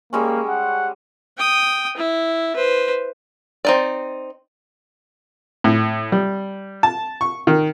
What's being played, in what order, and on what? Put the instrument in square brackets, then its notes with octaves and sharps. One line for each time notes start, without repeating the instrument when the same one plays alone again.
[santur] G3 G#3 C#4 [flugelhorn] A#3
[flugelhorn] F#5
[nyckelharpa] G5 D#6
E4
B4 C5
[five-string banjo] C4 D#4 D5
[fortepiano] A2
G3
A5
C#6
D#3